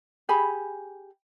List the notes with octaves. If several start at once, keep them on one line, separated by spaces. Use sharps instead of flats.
G4 G#4 G#5 B5